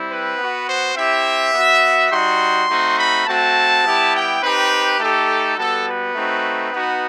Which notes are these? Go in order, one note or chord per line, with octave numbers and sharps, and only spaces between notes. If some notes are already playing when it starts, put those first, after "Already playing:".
Already playing: G3 C4 E4
B4
B3 F#4
C5
C4 E4 G4 E5
B3 F#4
G3 D#4 F#4 C6
A3 C4 D#4 F#4
B5
A3 C4 F#4 A5
G3 B3 E4 G4
G5
C4 D#4 G4 B4
A3 D#4 G4 A4
G3 B3 F#4 A4
B4
A3 C4 D#4 F#4
B3 D#4 F#4